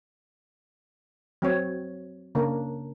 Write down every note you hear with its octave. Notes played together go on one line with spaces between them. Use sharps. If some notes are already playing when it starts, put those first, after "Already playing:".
F#3 C4 C#5
C#3 A#3 D4 A#4